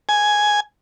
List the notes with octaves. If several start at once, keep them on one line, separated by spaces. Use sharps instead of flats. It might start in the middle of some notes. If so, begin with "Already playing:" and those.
G#5